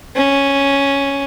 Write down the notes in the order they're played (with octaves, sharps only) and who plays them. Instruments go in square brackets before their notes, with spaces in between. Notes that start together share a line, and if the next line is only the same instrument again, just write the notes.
[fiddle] C#4